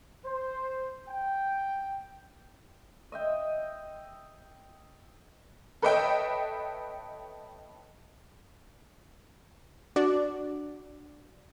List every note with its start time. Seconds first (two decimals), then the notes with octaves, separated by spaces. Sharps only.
0.24 C5
1.08 G5
3.12 D#5 E5 G5
5.82 A4 B4 C#5 D#5 E5 G5
9.96 D4 F#4 D5